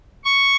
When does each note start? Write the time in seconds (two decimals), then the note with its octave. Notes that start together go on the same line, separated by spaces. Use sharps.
0.25 C#6